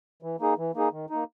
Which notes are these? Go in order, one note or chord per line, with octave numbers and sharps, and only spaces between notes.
E3
A#3 D#4 G#4
E3
A#3 D#4 G#4
D#3
A#3 D#4